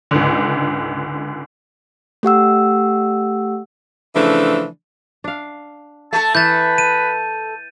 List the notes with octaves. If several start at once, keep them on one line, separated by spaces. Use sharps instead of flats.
C#2 G#2 D3
A3 G4 F#5 E6
C#3 E3 F3 A3 D4
D4 F5
A3 A4 A5
E3 B4 G6 A6
D#7